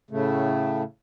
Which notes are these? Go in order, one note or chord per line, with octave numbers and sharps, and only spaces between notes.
A2 C#3 A3